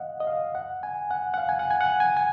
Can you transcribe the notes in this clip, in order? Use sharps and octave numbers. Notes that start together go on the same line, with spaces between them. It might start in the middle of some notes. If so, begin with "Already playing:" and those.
Already playing: D#5 F5 F#5
D#5
F5
F#5
G#5
F#5
F#5
F5
G#5
F#5
G#5
F#5
G#5
G#5